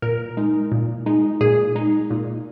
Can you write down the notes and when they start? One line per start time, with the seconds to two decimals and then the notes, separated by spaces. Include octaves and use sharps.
0.02 A#2 A#4
0.37 G#3 D#4
0.72 A#2
1.06 G#3 D#4
1.41 A#2 G#4
1.76 G#3 D#4
2.10 A#2